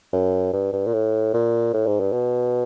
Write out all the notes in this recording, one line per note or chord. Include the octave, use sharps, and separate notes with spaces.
F#2
G2
G2
A#2
A2
A#2
A2
G#2
G2
B2